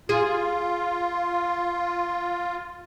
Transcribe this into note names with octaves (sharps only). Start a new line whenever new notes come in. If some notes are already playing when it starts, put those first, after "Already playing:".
F4 G#4